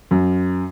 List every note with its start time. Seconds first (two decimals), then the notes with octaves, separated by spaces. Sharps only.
0.11 F#2